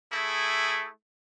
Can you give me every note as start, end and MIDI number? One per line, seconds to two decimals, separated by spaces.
0.12 0.88 57
0.12 0.88 64
0.12 0.88 68